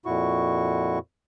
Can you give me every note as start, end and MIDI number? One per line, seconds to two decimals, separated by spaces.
0.06 0.99 41
0.06 0.99 46
0.06 0.99 64
0.06 0.99 66
0.06 0.99 85